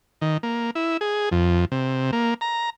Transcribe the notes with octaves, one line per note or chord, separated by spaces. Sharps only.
D#3
A#3
E4
G#4
F2
C3
A#3
A#5